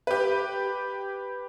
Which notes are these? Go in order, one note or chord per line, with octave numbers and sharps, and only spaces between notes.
G4 B4